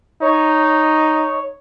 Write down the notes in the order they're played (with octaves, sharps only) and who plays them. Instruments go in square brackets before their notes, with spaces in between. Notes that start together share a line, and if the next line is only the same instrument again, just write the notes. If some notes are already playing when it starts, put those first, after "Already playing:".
[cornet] D#4 [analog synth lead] C#5